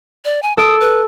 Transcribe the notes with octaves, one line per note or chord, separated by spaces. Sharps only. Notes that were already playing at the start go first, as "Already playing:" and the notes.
D5
G#5
A4 D#6 E6 D7
B4